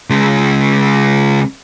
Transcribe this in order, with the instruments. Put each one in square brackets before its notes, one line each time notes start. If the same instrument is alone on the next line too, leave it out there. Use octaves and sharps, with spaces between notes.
[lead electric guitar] C#3 G#3